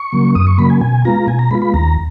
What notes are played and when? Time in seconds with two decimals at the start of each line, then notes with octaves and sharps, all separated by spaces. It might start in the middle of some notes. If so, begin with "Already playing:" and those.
Already playing: C#6
0.13 C#3 F#3 A#3
0.35 F#2 D#6
0.47 C#6
0.58 C#3 F#3 A#3 B5
0.70 G#5
0.81 B2 G#5
1.05 G#3 B3 F4 A#5
1.27 B2 G#5
1.39 A#5
1.51 G#3 B3 F4 B5
1.62 B5
1.74 D#2 A#5